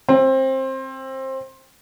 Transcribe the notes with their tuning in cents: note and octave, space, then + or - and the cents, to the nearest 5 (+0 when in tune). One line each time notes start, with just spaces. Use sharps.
C4 +20